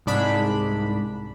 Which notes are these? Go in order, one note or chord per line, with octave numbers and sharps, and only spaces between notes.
C2 G#2 D4 B5